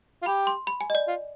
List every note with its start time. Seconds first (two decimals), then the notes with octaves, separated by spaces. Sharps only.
0.22 F4
0.26 G4 B5
0.47 C6
0.67 B5
0.81 G#5
0.90 D#5
0.95 D5
1.08 F4